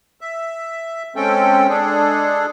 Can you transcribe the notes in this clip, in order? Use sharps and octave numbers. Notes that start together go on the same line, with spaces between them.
E5
G#3 C4 C#4 A4 G5
G#3 D4 G#4 A4